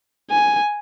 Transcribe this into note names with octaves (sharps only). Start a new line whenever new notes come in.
G#5